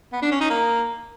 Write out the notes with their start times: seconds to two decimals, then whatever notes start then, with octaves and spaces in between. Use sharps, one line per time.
0.13 B3
0.22 D4
0.31 C#4
0.41 D#4
0.50 A#3